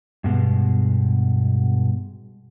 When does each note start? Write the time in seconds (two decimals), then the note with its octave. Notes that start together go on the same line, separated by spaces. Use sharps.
0.24 G2 B2 G#3